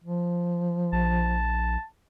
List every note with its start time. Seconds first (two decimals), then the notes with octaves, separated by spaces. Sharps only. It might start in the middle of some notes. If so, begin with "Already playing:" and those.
0.04 F3
0.92 A#1 A5